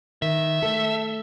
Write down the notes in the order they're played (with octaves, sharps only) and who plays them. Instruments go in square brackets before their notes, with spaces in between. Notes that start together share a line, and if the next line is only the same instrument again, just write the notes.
[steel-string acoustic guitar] D#3 [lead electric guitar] E5
[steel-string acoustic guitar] A3 A4